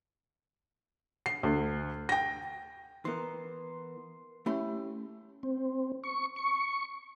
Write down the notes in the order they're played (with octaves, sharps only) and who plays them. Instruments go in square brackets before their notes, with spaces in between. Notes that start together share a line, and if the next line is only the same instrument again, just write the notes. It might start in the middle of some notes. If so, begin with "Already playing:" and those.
[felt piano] C7
D2
G5 A#6
[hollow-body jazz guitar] E3 B3 [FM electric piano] A#4 C6
[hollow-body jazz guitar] A3 B5 C6 [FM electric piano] C#4 E4 G4
[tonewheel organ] C4
C#6
C#6